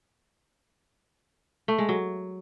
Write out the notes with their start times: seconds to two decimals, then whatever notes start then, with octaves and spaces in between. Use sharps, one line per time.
1.68 A3
1.78 G#3
1.89 F#3